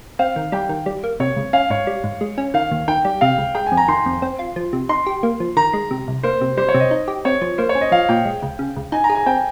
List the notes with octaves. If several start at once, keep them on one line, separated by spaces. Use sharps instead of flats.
C4 F5
D#3
G3 G5
D#3
G3
A#3
C3 C#5
C#2
C#4 F5
G#2 C#5
G3
G#2
G#3
C#4
D#3 F5
D#2
D#3 G5
G3
C3 F5
C#2
G#3 G5
G#5
F2
A#5
D#3 C6
F2
C4
F4
F3
C3
D#4 C6
G4
A#3
F3
D#3 A#5
G#3
C3
C2
A#3 C5
C3
G3 C5
C#5
C3
D#5
D#4
G4
C4 C#5
F3
A#3 C5
C#5
C#4
D#5
F3 F5
A#2 G5
G#3
C#2
C#3
C#2
D#4 G#5
A#5
G#4
G#5
C4 G5